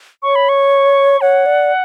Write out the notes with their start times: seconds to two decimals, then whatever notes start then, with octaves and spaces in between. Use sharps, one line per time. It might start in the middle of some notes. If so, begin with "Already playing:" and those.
0.23 C#5 C#6
0.36 B5
0.49 C#6
1.21 C#5 F#5
1.46 D5